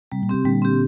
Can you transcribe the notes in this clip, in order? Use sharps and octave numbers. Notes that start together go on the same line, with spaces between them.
C3 G3
A#2
C3 C4 G4
A#2 D3 G3
C4 G4